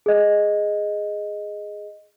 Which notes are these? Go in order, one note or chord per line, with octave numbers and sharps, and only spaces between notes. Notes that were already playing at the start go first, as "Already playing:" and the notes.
G#4 D#5